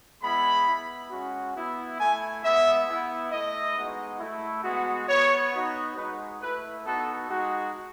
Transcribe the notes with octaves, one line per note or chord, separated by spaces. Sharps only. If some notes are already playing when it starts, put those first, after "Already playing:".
G#3 B3 E4 B5
B3 E4
G#3 C#4 F#4
B3 E4
A3 E4 G#5
G#3 B3 E4 E5
B3 E4
A3 E4 D#5
G#3 B3 D#4 F#4
A3 E4
G#3 B3 F#4
B3 F#4 C#5
B3 D#4 F#4
G#3 D#4 F#4 B4
A3 E4 B4
B3 D#4 F#4 A4
G#3 D#4 F#4